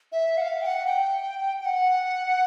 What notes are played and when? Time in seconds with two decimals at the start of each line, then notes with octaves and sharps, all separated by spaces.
0.12 E5
0.38 F#5
0.41 F5
0.61 G5
0.66 F#5
0.87 G5
1.61 G5
1.65 F#5